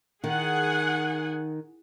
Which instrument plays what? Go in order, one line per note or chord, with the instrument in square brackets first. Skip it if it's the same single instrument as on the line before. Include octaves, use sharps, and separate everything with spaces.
[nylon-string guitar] D#3 [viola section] G#4 F#5 G#5